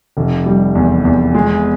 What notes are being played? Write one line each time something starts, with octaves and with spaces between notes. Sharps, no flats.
F1
G3
E2
E2
G#3